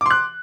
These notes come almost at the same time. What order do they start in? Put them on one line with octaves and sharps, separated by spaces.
D6 C6 F#6